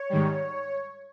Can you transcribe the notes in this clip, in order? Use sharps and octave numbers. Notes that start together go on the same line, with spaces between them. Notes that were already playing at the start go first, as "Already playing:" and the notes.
Already playing: C#5
G#2 D#3 G3